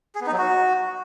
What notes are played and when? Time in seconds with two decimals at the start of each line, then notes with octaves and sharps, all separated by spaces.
0.15 G#4
0.21 B3
0.27 D#4
0.32 F#3
0.38 F#4